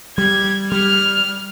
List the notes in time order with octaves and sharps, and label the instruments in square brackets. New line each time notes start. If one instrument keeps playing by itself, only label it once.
[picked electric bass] G3 [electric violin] G#6
[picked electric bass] G3 [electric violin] F6